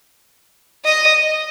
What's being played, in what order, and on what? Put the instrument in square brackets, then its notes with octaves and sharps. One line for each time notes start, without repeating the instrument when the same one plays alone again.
[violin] D#5